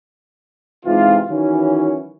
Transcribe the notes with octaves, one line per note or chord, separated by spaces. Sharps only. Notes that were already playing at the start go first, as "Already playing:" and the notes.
G#2 C3 E3 F4
D#3 E3 F#3 C#4